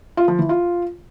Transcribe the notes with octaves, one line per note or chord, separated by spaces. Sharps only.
F4
F3
E3
F4